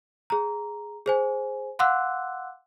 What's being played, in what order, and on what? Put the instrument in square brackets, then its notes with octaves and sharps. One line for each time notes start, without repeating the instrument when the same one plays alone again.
[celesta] G#4 A#5
G#4 C5 G#5
F5 F#5 C6 D6 E6 F#6